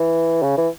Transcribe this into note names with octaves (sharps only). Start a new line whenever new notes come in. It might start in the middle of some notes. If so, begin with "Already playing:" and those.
Already playing: E3
C#3
E3